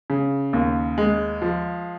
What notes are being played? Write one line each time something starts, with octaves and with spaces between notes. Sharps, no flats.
C#3
D#2
G#3
F3